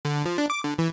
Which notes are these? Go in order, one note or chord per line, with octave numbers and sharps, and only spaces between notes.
D3
F3
D4
D6
D3
E3